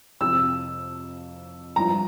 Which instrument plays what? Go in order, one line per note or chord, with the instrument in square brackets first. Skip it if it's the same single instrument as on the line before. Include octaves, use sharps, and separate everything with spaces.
[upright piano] F2 C3 F3 [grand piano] E6
[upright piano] G1 G2 F3 [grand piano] A#5